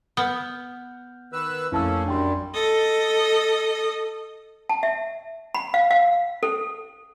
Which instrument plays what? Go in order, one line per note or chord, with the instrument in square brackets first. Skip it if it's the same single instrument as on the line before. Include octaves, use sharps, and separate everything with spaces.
[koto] B3 [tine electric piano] F#5 F6 G6
[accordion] D#3 B4 E6
[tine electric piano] A#1 F2 [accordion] A3 A#3 C#4 [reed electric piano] E4 A5 E6
[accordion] F#2 G3 [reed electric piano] D4 G5 C6
[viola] A4 D#5
[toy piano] A5
E5
B5
F5
F5
A4